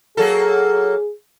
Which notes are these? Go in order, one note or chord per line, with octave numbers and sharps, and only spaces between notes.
F#3 A#3 G#4 A4